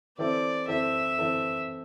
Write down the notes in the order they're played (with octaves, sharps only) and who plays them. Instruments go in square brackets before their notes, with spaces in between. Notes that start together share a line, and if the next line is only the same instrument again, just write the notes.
[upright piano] E3 C4 E4 A4 [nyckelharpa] D5
[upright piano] E3 C4 E4 A4 [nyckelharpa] E5
[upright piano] E3 C4 E4 A4